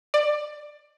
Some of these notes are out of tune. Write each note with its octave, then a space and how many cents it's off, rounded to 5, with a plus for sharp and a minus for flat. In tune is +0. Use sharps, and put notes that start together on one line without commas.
D5 +20